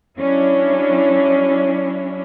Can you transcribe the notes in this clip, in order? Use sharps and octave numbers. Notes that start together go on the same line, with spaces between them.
F#3 C#4 D4 E4